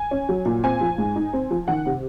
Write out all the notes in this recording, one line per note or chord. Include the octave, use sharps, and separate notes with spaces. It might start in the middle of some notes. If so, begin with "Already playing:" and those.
Already playing: G#5
C#4
F#3
A#2
C4 G#5
F3
G#2
D#4
C4
F3
D#3 F#5
C3